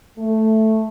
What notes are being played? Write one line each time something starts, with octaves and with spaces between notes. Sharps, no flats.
A3